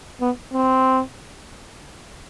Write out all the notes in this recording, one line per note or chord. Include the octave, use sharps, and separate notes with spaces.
B3
C4